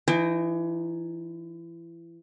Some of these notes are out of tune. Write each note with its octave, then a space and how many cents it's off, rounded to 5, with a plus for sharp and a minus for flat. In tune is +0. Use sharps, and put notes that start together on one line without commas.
E3 +30 D#4 +0 G#5 -45